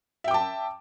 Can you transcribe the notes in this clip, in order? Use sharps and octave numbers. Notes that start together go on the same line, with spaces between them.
E5 G5 A5 D6